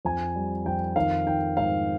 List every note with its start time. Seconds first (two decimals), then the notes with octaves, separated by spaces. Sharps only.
0.05 F2 G#5
0.36 G3
0.66 F2 G5
0.96 D#3 F5
1.26 D#3 G5
1.57 G#2 F5